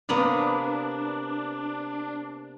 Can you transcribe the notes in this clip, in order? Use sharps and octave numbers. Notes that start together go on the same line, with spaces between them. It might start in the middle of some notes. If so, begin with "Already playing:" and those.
C3 A#3 B3 D4